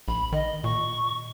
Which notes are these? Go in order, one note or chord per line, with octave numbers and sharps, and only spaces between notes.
A#1 B5
D#3 D#5
A#2 C#6